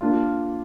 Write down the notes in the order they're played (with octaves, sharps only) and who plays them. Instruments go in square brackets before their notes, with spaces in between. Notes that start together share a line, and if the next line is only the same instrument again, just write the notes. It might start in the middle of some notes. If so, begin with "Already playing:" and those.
[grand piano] A#3 D4 F4